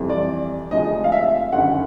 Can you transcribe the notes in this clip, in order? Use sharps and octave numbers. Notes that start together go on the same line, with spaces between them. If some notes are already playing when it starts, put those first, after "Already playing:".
Already playing: F2 C3 E3 G3
D5
D2 C3 F3 G#3 D#5
F5
E5
G1 F#2 D#3 F#5